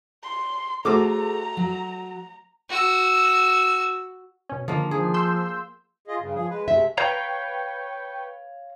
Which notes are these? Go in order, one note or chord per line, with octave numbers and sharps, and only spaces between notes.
C6
A3 F#4 G#4 A4 C5 A#5 D6
F#3
F#4 E6
B2 C#4
D3 D#3 F3 A#3
F3 G#4
C6 E6 G6
F4 G#4 D#5
G2 C#3
F3 G#4
G#3 B4
C3 G#3 A3 E5
B4 C#5 F5 G5 A#5 C#6